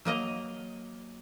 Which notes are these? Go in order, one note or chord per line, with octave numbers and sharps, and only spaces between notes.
F#3 A#3 D#5 A#5